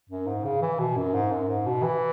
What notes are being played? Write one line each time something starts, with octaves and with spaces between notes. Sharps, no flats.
F#2
G#2
C#3
E3
B2
F#2
G#2
F#2
G#2
B2
E3